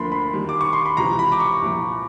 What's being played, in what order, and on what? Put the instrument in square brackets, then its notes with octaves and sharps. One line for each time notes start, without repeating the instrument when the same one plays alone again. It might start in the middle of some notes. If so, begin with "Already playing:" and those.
Already playing: [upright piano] D2 D3 F3 A#3 [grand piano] B5 C6
[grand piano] B5
[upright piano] D#2 D#3 G3
[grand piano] D6
C#6
C6
B5
[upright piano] C#2 C3 E3 [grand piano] A#5
[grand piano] B5
D6
C#6
[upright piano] C2 A#2 F3